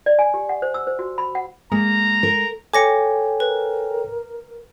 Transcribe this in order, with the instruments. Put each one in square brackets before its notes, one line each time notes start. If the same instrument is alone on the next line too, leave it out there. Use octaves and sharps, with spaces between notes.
[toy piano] D5
G#5
G4
F#5
C5
E6
C5
F#4
B5
F#5
[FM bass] G#3 [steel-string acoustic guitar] A#3 [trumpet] A#5
[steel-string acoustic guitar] A#4
[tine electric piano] A4 C#5 G5 [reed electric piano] G#5 [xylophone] D6 A#6 C#7
[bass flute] A#4 [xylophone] B4